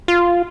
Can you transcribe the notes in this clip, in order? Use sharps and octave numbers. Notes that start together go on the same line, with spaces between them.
F4